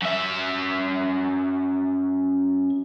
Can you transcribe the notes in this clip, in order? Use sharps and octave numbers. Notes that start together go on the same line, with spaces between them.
F#2 E5